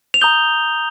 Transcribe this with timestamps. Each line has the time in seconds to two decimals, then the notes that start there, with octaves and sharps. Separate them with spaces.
0.14 F7
0.21 A#5 D#6 G6 G7